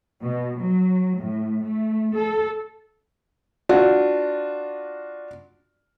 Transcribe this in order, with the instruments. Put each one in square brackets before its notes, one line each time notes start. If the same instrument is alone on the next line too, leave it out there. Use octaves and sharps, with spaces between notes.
[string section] B2
F#3
A2
A3
A4
[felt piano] D4 F4 F#4